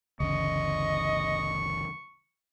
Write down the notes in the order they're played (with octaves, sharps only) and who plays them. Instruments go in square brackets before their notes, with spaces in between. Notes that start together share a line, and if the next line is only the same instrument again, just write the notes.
[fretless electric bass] G1 D2 [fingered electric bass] C#3 E3 C#4 [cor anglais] D#5 [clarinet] C#6